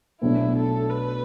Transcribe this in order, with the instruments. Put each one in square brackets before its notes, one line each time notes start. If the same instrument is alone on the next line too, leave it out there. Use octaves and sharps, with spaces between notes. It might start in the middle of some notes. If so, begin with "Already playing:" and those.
[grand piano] B1 B2 A3 D4 [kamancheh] E4
[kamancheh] A4
B4